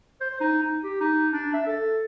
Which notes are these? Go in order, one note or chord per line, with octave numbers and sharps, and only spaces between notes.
C5
D#4
D#4
G4
D#4
D4
E5
A4